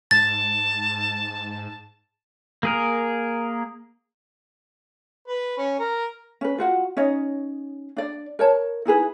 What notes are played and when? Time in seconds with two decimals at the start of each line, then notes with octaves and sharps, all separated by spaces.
0.11 G#2 A5 A6
2.63 A#3 G#4 A#4
5.27 B4
5.58 C#4
5.79 A#4
6.41 C#4 B4
6.58 F4 F#4 F#5
6.97 C#4 D#4 C#5 D#5
7.97 D4 D5
8.39 A#4 C#5 A5
8.85 D#4 E4 G#4 B4